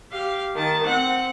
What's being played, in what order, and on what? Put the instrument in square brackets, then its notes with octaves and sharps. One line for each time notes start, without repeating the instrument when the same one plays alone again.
[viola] G4 F5
D#3 A5
C4 F#5